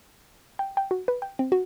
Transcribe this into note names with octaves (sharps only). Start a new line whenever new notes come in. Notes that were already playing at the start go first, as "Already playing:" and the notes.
G5
G5
F#4
B4
G5
C4
F#4